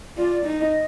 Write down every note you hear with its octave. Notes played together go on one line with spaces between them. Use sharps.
F4 D5
D#4
D#5